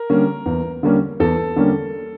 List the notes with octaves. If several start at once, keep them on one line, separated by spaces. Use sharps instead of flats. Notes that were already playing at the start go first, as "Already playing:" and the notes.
Already playing: A#4
D3 G3 A#3 C#4
E2
D3 G3 A#3 C#4
E2 A4
D3 G3 A#3 C#4